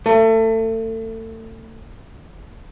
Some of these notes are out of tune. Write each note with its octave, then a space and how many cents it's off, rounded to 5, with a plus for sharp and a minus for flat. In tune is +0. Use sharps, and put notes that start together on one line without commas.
A3 +30